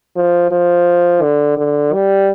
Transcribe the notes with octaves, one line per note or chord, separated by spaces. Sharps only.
F3
F3
D3
D3
G3